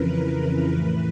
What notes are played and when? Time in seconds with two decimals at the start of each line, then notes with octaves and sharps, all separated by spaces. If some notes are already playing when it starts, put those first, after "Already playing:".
Already playing: F2 C#3 E3 A#4 B4
0.74 A2 E3 B4